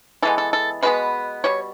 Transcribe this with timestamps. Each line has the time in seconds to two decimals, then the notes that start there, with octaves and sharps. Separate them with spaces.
0.22 E3 G#3 B3 A4
0.38 A4
0.53 A4
0.83 B2 G#3 B3 B4
1.44 B2 G3 C#5